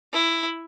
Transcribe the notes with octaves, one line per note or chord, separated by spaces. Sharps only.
E4